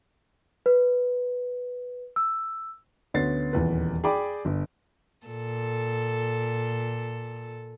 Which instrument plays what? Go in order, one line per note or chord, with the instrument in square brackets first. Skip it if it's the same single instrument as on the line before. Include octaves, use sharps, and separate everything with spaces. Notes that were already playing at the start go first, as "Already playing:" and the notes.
[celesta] B4
E6
[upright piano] D2 B3 C#4 A6 C7
D#1 E2 B4
G#4 D5 G5 B5 D6
G1
[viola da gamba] A#2 A4